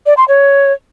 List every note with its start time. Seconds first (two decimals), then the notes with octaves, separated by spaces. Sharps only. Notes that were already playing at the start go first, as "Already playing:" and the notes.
0.06 D5
0.17 C6
0.28 C#5